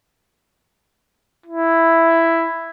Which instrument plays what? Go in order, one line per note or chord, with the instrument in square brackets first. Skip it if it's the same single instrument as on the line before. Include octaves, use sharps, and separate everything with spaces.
[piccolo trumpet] E4